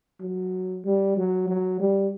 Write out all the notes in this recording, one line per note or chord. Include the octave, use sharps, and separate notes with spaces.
F#3
G3
F#3
F#3
G3